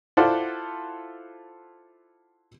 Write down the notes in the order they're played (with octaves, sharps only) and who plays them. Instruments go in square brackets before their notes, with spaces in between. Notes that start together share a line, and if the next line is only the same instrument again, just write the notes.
[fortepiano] E4 F4 A4 C5 D5 F#5